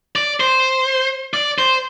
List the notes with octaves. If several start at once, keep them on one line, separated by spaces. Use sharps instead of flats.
D5
C5
D5
C5